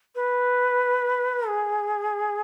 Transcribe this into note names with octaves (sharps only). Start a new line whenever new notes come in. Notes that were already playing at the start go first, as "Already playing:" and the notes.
B4
G#4